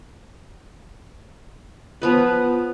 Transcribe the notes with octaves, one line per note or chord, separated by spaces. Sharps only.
F3 B3 B4